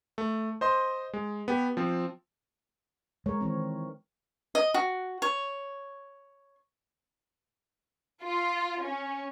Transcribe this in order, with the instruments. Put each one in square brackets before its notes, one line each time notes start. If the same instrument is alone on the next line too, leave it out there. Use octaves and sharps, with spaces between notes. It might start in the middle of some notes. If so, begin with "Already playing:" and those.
[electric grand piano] A3
C5 D#5 C6
G#3
B3 G4
F3 C4
[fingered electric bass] G#3 [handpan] A#4 C#5
[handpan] D#3 E3 C4
[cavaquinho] D#5
F#4
C#5
[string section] F4
C#4